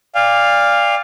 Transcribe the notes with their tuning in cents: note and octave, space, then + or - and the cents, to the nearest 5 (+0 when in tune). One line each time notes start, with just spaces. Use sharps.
D5 +0 F5 +0 G#5 -45